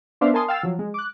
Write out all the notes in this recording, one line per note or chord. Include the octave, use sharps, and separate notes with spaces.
B3 D4 C5 D5 E5 F5
A#4 G#5 A5 C6 D#6
F5 G5 E6 A6
F3 F#3
G#3
D6 F#6